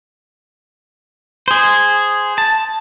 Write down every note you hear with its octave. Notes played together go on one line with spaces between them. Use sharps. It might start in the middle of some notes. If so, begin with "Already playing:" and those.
G#4 C5
A5